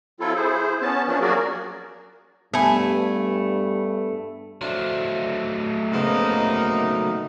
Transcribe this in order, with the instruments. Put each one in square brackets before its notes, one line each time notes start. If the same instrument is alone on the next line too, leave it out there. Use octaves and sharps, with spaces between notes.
[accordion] F#3 C4 E4 F4 A4
E4 G#4 C5
B3 C#4 A5
F3 A#3 C#4 D4
F#3 A#3 F#4 G#4 A#4 D5
[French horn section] G2 [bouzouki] A3 G#5 [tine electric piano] B3 E5 B5
[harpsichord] F3 D4 F4 [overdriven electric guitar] F#3 A3
[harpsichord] C#2 F3 [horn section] A#3 B3 D#4